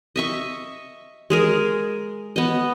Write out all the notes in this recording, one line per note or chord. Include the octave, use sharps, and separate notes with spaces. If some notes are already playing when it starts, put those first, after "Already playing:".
D#5 E5 C#6
G#3 G#4 A#4
B3 D#5